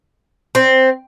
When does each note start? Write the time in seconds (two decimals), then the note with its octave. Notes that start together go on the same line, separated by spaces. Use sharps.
0.55 C4